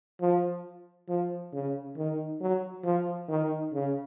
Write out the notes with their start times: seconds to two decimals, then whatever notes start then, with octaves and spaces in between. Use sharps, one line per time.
0.21 F3
1.09 F3
1.53 C#3
1.97 D#3
2.41 F#3
2.85 F3
3.29 D#3
3.73 C#3